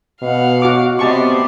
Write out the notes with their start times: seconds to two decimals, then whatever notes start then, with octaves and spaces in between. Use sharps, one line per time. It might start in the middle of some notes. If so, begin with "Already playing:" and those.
0.22 B2 F5 F#5
0.62 F#4 D6
0.99 C3 B3 G4 C5 D5 D#5 A5 C#6